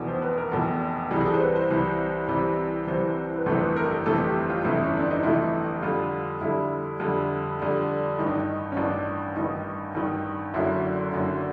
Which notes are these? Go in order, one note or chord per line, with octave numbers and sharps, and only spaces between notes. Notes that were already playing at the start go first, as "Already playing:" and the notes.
Already playing: F1 E2 B2
C5
B4
A#4
F1 E2 B2 A4
C2 C3 E3 G3 G#4
G#4
A4
C5
B4
C5
C2 C3 E3 G3
C2 C3 E3 G3
C2 C3 E3 G3 C5
B4
G1 F2 C3 E3 A3 C5
B4
A#4
A4
G1 F2 C3 E3 A3 A4
G4
F4
G1 F2 C3 E3 A3 E4
C#4
D4
D#4
G1 F2 C3 E3 A3 E4
F2 D3 G3 F4
F2 D3 G3 E4
F2 D3 G3
F2 D3 G3
A1 G2 D#3 D#4
D4
D#4
C#4
A1 G2 D#3 D4
A1 G2 D#3 D#4
A1 G2 D#3
F#1 F#2 D3 F#3 E4
F#1 F#2 D3 F#3